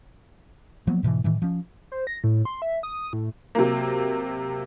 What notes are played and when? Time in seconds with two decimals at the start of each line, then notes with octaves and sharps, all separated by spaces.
0.87 F3 F#3 A#3 B3
1.03 G#2 B2 D3 E3
1.24 A2 D#3 E3
1.42 F3 C#4
1.92 C5
2.07 A#6
2.24 A2
2.45 C6
2.62 E5
2.83 D#6
3.13 A2
3.55 C3 F#3 A#3